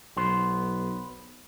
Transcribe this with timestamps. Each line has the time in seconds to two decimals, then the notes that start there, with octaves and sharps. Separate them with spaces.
0.17 B1 B3 C5